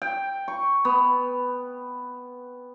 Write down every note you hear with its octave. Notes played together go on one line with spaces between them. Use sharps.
G5
C#6
B3